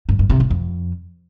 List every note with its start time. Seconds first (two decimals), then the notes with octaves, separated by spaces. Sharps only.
0.09 G2
0.19 G2
0.30 C3
0.40 G#2
0.50 F2